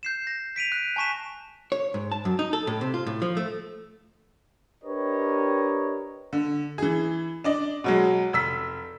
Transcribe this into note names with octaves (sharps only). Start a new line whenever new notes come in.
G6 C7 E7
A#6
B6 D7 D#7 F7
F#6
G#5 A5 C#6 B6 E7
C#5
G#2
A5
F#2
D#4
A4
A2
C3
F4
A2
F3
A3
D4 G4 A#4 B4 C#5 D#5
D3
E3 G#4
D4 D5 D#5
B2 F#3 G#3
F1 E6 B6